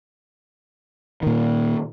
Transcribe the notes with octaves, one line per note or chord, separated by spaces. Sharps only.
A#2 D#3